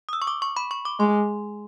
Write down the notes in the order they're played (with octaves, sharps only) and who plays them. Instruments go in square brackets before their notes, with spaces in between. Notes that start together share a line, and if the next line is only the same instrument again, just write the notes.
[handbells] D#6
E6
C#6
D6
C#6
B5
C#6
D6
[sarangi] G#3 [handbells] C6